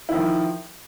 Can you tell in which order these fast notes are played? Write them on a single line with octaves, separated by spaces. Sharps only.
E4 D#3 F3